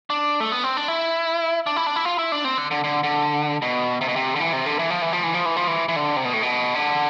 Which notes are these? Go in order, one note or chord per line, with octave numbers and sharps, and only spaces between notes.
D4
A3
B3
C4
D4
E4
D4
E4
D4
E4
F4
E4
D4
C4
D3
D3
D3
D3
B2
C3
B2
C3
D3
E3
C3
D3
E3
F3
E3
F3
E3
F3
E3
F3
E3
E3
D3
C3
B2
A2
B2
D3